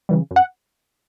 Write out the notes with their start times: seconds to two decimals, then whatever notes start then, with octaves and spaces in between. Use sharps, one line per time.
0.09 C#3 E3 G3
0.31 F#2
0.36 F#5